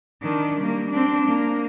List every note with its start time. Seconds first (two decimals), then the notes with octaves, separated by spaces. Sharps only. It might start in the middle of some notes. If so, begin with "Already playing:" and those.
0.22 D#3 D4
0.60 G3 A#3
0.91 C4 D4
1.27 A#3